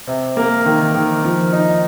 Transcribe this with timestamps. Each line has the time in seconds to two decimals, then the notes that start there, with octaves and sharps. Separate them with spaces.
0.07 C3
0.37 A#3
0.66 D#3
0.94 D#3
1.23 F3
1.52 D#4